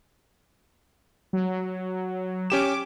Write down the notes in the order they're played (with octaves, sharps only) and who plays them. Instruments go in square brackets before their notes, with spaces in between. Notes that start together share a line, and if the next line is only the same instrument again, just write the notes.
[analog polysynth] F#3
[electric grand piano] C#4 G4 E7 [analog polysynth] D6